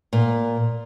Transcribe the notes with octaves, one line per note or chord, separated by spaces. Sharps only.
A#2